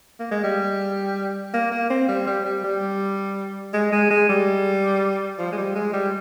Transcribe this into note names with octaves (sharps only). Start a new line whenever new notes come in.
A#3
G#3
G3
A#3
A#3
C4
G3
G3
G3
G3
G#3
G#3
G#3
G3
F3
G#3
G3
G#3
G3